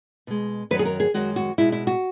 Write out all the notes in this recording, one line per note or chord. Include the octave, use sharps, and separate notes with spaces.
B2 G#3
F#2 D#3 F#3 B4
G#4
A#4
G#4
F#2 D#3 G#3 F#4
F#4
B2 G#3 E4
E4
F#4